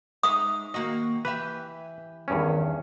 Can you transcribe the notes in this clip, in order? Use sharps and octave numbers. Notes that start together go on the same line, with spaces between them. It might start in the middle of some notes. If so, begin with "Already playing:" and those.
G#3 D#4 E5 D#6
D#3 A#3 F#4 D#5
E3 G4 B4 E5
E2 G2 D#3 C#4